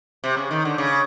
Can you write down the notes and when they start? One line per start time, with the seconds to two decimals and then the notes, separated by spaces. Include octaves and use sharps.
0.24 C3
0.37 C#3
0.51 D#3
0.65 D3
0.78 C#3